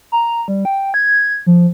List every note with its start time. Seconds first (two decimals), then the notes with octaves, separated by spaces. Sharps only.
0.12 A#5
0.48 G3
0.65 G5
0.94 G#6
1.46 F3